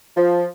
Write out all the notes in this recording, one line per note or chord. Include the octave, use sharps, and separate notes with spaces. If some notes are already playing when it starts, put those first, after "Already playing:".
F3